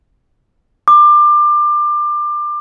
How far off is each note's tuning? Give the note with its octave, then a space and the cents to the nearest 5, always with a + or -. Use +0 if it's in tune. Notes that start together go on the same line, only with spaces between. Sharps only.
D6 +25